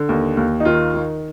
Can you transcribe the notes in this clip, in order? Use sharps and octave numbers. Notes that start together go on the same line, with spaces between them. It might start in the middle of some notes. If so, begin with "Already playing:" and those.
Already playing: D3
D#2
D#2
D#4
D#3 F4
D#3